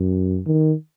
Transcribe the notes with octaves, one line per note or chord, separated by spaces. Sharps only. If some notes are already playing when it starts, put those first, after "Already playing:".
Already playing: F#2
D#3